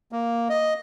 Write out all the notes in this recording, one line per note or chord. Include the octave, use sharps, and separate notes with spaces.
A#3
D#5